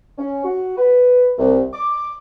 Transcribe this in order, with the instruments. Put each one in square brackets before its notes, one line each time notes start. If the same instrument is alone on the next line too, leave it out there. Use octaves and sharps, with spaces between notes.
[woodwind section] C#4
F#4
B4
C2
D6